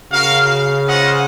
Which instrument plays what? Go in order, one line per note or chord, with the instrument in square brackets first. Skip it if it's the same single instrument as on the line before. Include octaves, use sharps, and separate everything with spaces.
[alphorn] C#3 [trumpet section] F#4 A#4 F5
[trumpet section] C#4 F4 C5 D#5 F#5